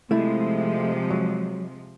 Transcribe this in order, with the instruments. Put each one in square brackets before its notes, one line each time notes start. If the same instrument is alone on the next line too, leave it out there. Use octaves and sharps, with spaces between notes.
[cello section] C3 F3 G#3 [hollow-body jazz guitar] A3 E4
[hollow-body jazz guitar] F#3